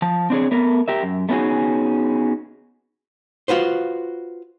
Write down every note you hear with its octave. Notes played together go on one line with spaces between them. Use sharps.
F3 A5
C4 D4 G#4 C#5
A3 B3 A#4
G4 A#4 E5
F#2
A3 B3 C#4 D#4 F#4 G#4
F4 F#4 B4 C5